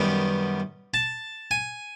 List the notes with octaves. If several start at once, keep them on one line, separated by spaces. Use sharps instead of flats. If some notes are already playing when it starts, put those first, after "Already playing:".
Already playing: F#2 D#3 G3 B3
A5
G#5